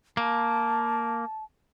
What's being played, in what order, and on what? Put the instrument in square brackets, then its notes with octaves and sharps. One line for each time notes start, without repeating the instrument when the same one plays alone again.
[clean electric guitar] A#3 [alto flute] A5